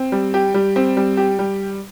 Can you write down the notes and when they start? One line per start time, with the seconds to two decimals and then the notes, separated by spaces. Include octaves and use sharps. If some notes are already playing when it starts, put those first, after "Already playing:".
Already playing: C4
0.12 G3
0.34 G4
0.54 G3
0.76 C4
0.97 G3
1.17 G4
1.39 G3